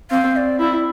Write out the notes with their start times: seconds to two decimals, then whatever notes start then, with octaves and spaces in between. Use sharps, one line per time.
0.11 C4 F5
0.36 D5
0.60 E4 D5